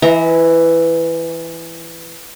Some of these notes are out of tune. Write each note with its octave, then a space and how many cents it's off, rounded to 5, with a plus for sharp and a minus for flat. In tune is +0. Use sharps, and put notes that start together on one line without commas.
E3 +10 E5 -40 A#5 -10